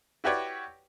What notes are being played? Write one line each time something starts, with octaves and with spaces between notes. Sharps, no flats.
E4 F#4 G4 B4 C#5 D5